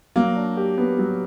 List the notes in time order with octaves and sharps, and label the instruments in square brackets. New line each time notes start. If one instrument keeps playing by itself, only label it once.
[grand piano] F#3 [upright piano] A#3
[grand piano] D4
G4
B3
F#3